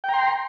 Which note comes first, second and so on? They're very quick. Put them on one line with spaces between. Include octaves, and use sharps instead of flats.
G5 A#5 C6